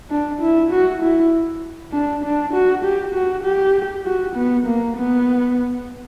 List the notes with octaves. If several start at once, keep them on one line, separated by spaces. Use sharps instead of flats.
D4
E4
F#4
E4
D4
D4
F#4
G4
F#4
G4
F#4
B3
A#3
B3